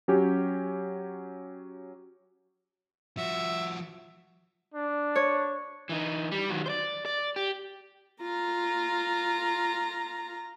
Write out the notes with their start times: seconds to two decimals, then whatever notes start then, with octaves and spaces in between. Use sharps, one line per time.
0.08 F#3 C#4 G4
3.17 F3 F#4 E5
4.74 D4
5.15 C#5
5.89 E3 D#4
6.31 G3
6.50 D#3 F#3
6.66 C5 D5
7.06 D5
7.36 G4
8.22 F4 A#5